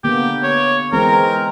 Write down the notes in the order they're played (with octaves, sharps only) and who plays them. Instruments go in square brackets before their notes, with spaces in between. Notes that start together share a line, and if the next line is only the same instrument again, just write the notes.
[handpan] D3 A#3 B3 [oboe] G4
[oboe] C#5
[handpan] E3 G#3 C4 [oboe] A#4